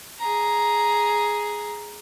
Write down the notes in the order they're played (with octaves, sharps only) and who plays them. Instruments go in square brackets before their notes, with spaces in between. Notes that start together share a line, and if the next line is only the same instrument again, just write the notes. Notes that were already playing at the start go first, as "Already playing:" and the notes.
[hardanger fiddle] G#4 A#5